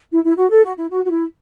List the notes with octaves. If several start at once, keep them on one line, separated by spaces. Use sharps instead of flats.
E4
E4
F#4
A4
F#4
E4
F#4
F#4
E4